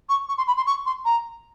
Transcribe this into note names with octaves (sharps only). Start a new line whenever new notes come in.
C#6
C#6
C6
B5
C6
C#6
C6
A#5